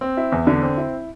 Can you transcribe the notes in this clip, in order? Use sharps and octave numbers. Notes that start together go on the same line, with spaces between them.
C4
E4
E2
D3
C4
E4